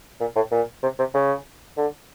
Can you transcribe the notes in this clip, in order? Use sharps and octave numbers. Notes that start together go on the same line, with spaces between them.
A#2
A2
A#2
C3
C3
C#3
D3